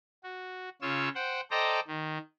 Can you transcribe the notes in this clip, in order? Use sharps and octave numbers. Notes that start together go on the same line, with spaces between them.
F#4
C#3 F4 C#5 E6
C5 F#5 G5
A4 C5 D5 D#5 G5 A#5
D#3